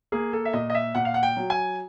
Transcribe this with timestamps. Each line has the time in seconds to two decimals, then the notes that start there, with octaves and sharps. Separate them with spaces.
0.12 A#3 G#4
0.33 A4
0.45 E5
0.53 A#2 D#5
0.70 D#5
0.75 E5
0.95 A#2 F#5
1.05 F5
1.14 F#5
1.23 G5
1.37 F#3
1.50 G#5